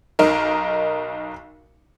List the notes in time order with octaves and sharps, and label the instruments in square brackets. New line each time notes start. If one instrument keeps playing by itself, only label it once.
[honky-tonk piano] B1 D#4 A#4